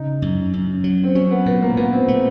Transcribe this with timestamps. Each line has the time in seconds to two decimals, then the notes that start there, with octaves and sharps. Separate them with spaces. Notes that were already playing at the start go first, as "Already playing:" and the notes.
Already playing: C#3 D#4
0.22 F#2
0.54 F#2
0.84 F#3
1.03 C4
1.15 F#3 C#4
1.31 B3
1.46 A#2 B3
1.62 A#3
1.77 A#2 B3
1.93 C4
2.08 A3